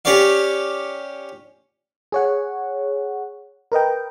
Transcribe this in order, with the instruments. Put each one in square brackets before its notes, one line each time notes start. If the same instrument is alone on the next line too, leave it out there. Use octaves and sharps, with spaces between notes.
[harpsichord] C#4 G4 C#5 D5 F5
[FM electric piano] G#4 C#5 F#5
A#4 B4 D#5 G5